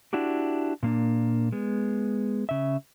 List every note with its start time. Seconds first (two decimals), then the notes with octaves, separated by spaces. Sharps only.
0.13 D4 E4 F#4 G4
0.83 A#2 A#3 D4
1.52 G#3 B3
2.49 C#3 E5